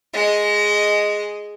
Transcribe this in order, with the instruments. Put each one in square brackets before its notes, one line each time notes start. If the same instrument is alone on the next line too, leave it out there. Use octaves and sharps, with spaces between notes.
[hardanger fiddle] G#3 D#5